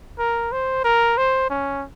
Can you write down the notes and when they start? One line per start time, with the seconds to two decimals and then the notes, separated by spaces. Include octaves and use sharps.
0.18 A#4
0.52 C5
0.84 A#4
1.17 C5
1.50 C#4